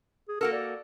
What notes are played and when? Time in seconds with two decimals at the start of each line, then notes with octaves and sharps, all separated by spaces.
0.29 G#4
0.41 A#3 F#4 A4 A#4
0.53 D5